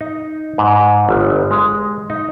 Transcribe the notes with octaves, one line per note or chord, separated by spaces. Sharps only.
D#4
G#2
G1
G#3
D#4